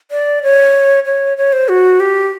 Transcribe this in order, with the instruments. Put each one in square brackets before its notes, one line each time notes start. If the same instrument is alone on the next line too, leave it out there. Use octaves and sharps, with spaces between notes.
[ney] D5
C#5
C#5
C#5
C5
F#4
G4